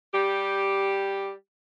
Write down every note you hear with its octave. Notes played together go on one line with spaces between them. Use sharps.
G3 G4